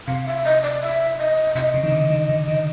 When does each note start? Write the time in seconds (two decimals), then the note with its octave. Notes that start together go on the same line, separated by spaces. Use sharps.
0.08 C3 F5
0.26 E5
0.45 D#5
0.63 D5
0.82 E5
1.19 D#5
1.55 C3 D#5 E5
1.74 C#3
1.84 D#3
1.92 D3
2.10 D#3
2.29 D3
2.48 D#3